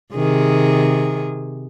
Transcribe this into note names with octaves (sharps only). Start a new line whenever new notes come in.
C3 D#3 G#4